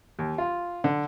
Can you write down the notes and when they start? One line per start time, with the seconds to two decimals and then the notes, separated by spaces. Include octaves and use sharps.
0.19 D#2
0.38 F4
0.84 D3